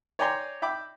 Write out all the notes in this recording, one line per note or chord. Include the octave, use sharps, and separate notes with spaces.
C#5 D5 G5 G#5 A#5 C6
E5 G5 B5 D6